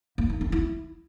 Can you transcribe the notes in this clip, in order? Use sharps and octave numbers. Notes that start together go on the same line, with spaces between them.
A#3
D#4
C#4
E4